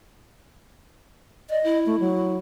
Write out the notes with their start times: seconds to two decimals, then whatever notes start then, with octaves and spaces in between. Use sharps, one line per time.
1.50 D5 D#5
1.64 E4
1.86 A3
2.00 F#3